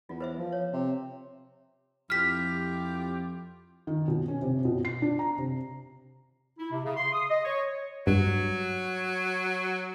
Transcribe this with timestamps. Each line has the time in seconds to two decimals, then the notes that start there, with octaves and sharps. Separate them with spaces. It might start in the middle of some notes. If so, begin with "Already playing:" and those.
0.09 E2 F4
0.21 B4 C5 E5
0.38 F3
0.52 C#5
0.73 C3
2.10 F2 E4 F4 G4 F6 B6
3.87 D#3
4.08 B2
4.28 C#4
4.42 C3
4.65 B2
4.85 C7
5.02 D4
5.19 A#5
5.38 C3
6.58 E4
6.71 C3
6.84 C#3
6.96 C6
7.13 D#6
7.29 D#5
7.43 C#5
8.07 G2 F#3